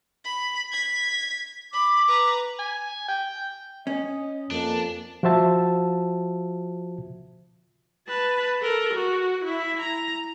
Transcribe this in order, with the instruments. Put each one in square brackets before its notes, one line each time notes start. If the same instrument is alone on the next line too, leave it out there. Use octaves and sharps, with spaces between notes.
[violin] B5
G#6 B6
[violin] B5 [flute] D6
[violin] B4 A#5
[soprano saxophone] G#5
G5
[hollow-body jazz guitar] C#4 [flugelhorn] D#5
[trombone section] F2 A#3 [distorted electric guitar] D4
[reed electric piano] F3 F4 F#4 C5 E5 A5
[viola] B4 A5
A4 A#4
F#4
E4 E5
A#5